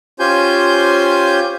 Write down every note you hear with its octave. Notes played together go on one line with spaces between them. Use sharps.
C#4 F4 G4 C5 G#5 G6